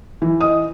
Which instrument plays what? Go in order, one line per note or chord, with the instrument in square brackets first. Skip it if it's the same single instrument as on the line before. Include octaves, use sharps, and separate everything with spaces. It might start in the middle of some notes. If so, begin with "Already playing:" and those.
[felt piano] E3
D#5 D#6